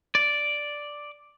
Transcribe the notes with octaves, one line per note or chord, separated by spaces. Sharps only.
D5